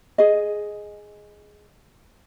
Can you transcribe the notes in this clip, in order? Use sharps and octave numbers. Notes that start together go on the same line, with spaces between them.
G#4 D#5